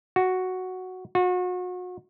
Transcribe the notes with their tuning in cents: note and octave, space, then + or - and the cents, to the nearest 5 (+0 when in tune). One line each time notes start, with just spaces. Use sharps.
F#4 +0
F#4 -35